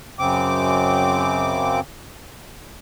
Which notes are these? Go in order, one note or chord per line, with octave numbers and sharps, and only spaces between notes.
F#2 C#3 C4 D6